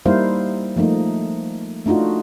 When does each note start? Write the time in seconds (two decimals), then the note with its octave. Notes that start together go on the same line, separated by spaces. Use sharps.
0.06 G3 A#3 D#4 E4 C5 F5
0.76 F3 A3 A#3 D#4
1.86 A3 D4 D#4 F4 F#4